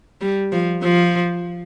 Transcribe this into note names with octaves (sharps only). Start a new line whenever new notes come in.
G3
F3
F3